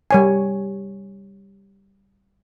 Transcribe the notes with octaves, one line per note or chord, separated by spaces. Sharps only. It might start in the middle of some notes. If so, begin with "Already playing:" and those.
G3 C#5 G#5